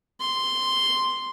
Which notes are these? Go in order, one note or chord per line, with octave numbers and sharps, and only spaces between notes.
C6